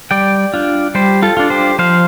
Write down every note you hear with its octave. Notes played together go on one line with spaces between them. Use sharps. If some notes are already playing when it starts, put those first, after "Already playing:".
G3 D5 G5
D4 F4
G3 G4 C5
F4 A4
D4 F4
G4 C5
F3 C5 F5